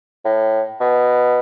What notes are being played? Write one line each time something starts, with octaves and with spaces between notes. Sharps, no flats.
A2
B2